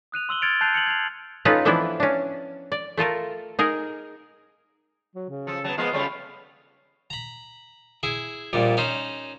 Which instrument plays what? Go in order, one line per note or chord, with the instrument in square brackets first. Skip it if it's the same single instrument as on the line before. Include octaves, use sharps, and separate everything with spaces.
[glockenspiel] D#6 F#6 D#7 F7
C6 E6 F#7 G7
F6 G#6 A6 C#7 D7 F7
A5 F#6 G6 C7 D#7 F7
E6 C#7 F7 F#7
G#6 C7 F7
[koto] C#4 D#4 F4 A4 B4
E3 F3 B3 D4 E4
C#4 D4
D5
A3 F4 A4 A#4
D#4 G#4 A#4
[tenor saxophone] F#3
C#3
[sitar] F3 [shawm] A4
[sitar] F#3 B3 [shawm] A5
[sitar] F3 G#3 A#3 [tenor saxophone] B3 [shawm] F4
[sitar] C#3 G3 A3 [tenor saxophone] C#5
[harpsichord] A#5 B5
E4 G#4
A#1 A#2 G3
C#4 D#4 C5